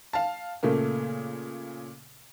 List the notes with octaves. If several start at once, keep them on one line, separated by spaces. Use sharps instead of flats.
F5 A5
A#2 C#3 A3 A#3